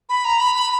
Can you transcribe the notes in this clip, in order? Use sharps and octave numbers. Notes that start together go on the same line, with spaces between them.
B5
A#5
B5
B5